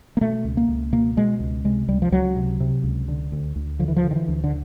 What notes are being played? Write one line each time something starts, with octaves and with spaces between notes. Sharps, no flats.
A#3
B2 A3
C#2
A#3
C#2
B2 A#3
B2 G#3
C#2
C3 G#3
C#2 G3
F3
C#2 F#3
C3
C3
C#2
D3
D2
D2
D3 F3
E3
F3
D3
D#3
E3
D2
D3